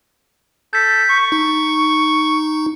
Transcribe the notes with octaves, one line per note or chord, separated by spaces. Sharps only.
A4 G6 B6
C#6
D#4